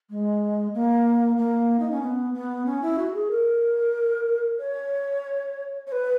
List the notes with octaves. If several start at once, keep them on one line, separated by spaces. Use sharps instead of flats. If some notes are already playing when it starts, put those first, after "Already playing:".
G#3
A#3
A#3
D#4
C#4
B3
B3
C#4
E4
F#4
G#4
A#4
C#5
C#5
B4